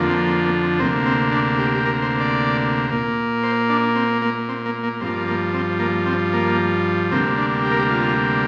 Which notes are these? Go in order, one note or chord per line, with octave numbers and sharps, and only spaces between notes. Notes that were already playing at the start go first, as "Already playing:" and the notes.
Already playing: F2 D3 F3 A#3
C4
C4
A#3
C4
D2 C3 A#3 C4
C4
D4
G4
G4
A#4
C5
D5
A#2 A#3
C5
D4
C4
A#3
C4
A#3
A#3
G2 F3 A#3 C4
A#3
C4
A#3
C4
A#3
D2 C3 G3 A#3 C4
D4
G4
A#4
G4
F4